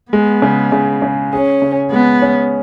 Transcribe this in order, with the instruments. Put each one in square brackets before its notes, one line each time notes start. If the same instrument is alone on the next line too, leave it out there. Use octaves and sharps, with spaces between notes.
[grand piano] G#3 [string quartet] B3
[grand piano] C#3
C#3
C#3
[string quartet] C#4 [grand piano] G#4
[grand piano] C#3
[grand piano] G#3 [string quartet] B3
[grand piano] C#4